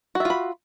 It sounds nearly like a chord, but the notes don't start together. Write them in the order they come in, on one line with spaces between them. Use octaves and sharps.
F#4 E5 F4 B5